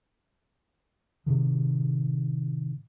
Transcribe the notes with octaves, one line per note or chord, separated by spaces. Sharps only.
A2 C3 D#3